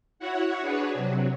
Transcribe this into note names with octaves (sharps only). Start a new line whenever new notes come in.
E4 F#4 C#5 F#5
D4 F#4 G#4 B4 C#5
C3 F#3